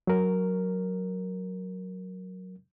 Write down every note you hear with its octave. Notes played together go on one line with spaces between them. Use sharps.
F#3 A#4